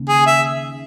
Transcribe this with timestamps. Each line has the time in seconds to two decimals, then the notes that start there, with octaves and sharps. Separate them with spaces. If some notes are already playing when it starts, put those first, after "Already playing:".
Already playing: D#2 C#3
0.09 G#4
0.26 E5